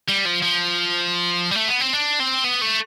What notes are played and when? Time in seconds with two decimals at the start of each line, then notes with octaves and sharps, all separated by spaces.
0.09 G3
0.26 F3
0.43 F3
1.51 G3
1.55 A3
1.68 B3
1.81 C4
1.93 D4
2.20 C4
2.44 B3
2.61 A3